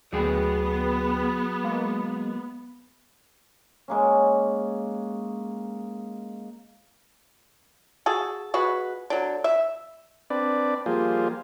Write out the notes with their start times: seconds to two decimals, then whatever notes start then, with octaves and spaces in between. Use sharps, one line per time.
0.13 D2 F#3 B3 G#4 G5
1.63 G#3 A#3
3.88 G#3 A#3 C#4
8.06 F#4 G#4 A4
8.54 G#3 F#4 B4
9.10 D3 F#3
9.44 E5
10.30 C4 D4 B4 D5
10.86 F3 G3 A#3 F4 G#4 C5